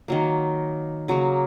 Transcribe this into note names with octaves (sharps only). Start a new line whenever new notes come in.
D#3 F#3 A#3
C#3 F#3 A#3